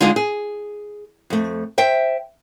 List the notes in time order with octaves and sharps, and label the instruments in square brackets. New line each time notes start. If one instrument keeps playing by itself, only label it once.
[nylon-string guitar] D3 G#3 D4 D#4 F4 G#4
G#4
F2 A3
C5 E5 G5